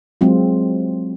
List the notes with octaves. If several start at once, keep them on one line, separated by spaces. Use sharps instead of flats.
F#3 G#3 C4 F4